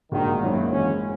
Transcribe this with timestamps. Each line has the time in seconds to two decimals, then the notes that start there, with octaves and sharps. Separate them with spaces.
0.12 A#1 A#2 D#3 G#3 D#4 F#4
0.41 G#1 F#2 D#3 F#3 A#3 E4
0.71 G#2 E3 G#3 C#4